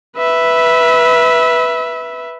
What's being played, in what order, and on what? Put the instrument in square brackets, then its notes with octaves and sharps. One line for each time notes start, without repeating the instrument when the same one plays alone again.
[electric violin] B4 E5